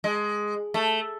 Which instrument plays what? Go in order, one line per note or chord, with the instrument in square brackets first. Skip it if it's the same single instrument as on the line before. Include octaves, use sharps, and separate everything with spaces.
[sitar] G#3
A3